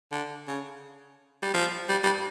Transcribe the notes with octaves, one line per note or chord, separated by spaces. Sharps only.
D3
C#3
G3
F3
G3
G3